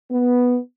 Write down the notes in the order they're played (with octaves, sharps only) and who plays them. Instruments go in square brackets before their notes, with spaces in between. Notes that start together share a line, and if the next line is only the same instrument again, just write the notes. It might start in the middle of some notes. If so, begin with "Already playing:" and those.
[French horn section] B3